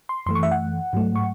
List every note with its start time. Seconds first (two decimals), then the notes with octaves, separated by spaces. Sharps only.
0.09 C6
0.26 F#2 E3 A3 C6
0.35 C#6
0.43 E5
0.51 F#5
0.93 G#2 F#3 A3
1.16 C#6